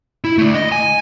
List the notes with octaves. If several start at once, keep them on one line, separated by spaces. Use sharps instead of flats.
E4
D3 A3
D#5
G#5